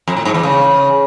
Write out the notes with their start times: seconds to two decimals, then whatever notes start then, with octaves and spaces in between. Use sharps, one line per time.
0.08 F2
0.17 A2
0.25 G#2
0.34 E2
0.43 C#3